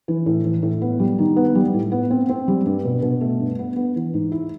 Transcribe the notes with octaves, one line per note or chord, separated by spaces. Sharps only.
E3
A2
E3
A2
B3
G3
D#3
B3
G3
A2
B3
C4
C4
G3
G2
B2
B2
A3
G2
B3
B3
E3
G#2
E4